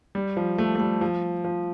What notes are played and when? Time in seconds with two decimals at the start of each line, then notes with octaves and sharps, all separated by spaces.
0.15 G3
0.37 F3
0.58 A3
0.75 A3
0.80 G3
1.01 F3
1.44 F3